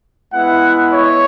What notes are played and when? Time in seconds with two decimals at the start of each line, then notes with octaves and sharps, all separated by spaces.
0.33 G#3 B3 E4 F#5
0.92 C#5